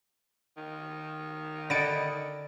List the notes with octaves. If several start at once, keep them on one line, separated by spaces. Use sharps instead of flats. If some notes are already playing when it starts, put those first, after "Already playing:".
D#3
D3 D#5 B5 A6 C#7 D7